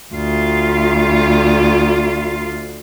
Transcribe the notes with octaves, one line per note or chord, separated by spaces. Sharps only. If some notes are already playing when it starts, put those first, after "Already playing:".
D2 F4